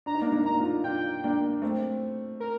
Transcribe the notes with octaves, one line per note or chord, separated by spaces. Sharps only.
D4 A#5
D#4
A#3 D4
A#3 D4
D4
A#5
D#4
D4 F4
D4 F4 G5
A#3 D4
A3 C4
A#4